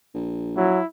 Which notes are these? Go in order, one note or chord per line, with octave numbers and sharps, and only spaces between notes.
A#1
F#3 E4